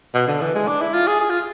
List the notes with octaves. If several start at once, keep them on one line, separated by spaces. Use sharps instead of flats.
B2
D3
E3
G#3
D4
E4
F4
G#4
G#4
F4